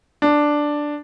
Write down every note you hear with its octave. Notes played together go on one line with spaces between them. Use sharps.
D4